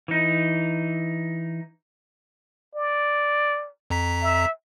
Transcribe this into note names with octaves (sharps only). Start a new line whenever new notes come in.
E3 D#4
D5
F2 A#5 B6
E5